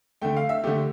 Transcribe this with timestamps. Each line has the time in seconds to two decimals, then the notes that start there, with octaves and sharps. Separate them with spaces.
0.22 D3 A3 G5
0.36 F5
0.49 E5
0.64 D3 A3 G4